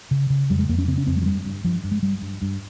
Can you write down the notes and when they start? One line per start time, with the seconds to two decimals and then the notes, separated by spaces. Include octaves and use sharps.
0.11 C#3
0.30 C#3
0.50 F2 G3
0.59 G#3
0.69 F2 A#3
0.78 C#4
0.88 C#3 C4
0.98 C#4
1.07 F2 C4
1.17 G#3
1.22 F3
1.26 G2 G3
1.45 G2
1.64 G2 F3
1.84 G2
1.91 G#3
2.03 G2 G3
2.22 G2
2.42 G2